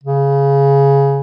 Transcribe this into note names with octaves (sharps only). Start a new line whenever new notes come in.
C#3